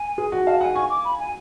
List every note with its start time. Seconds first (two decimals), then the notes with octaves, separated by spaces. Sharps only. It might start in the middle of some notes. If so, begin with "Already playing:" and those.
Already playing: G#5
0.18 G#4
0.32 F#4
0.46 F5 A5
0.61 F#5 G#5
0.75 G#5 C#6
0.90 D6
1.05 B5
1.20 G#5